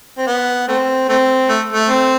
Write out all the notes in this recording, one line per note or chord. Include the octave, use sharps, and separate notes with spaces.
C4
B3
A3 C4
A3 C4
A3
A3
C4